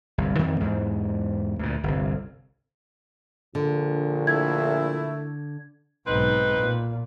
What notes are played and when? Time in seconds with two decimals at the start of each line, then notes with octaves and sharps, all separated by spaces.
0.18 G1 C2
0.39 F2 D#3 E3 C4
0.60 E2 G#2
1.59 D2 A#2
1.83 G1 C2
3.55 A#1 D3
4.27 A3 E4 G#6
6.07 B1 G#2 C4 D#4 B4
6.56 A#2